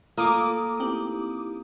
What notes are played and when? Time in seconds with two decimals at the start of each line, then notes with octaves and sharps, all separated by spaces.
0.18 A3 A#3 F4 A4 D6 D#6
0.80 C4 D#4 E4 G4